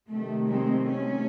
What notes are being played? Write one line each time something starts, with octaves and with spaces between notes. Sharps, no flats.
C3 D#3 F#3 A3
G#3 C4
A3 C#4